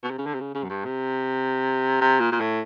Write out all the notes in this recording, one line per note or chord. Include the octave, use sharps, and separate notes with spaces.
B2
C3
C#3
D3
C3
C#3
C#3
F#2
G2
C3
C3
A#2
A#2
A2